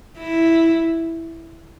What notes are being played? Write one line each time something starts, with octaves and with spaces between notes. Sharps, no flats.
E4